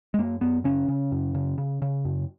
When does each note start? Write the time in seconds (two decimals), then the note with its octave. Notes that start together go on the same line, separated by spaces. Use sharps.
0.14 G#3
0.18 F#2 A#3
0.41 F#2 B3
0.64 C#3 C#4
0.88 C#3
1.12 F#2
1.35 C#3
1.58 C#3
1.82 C#3
2.05 F#2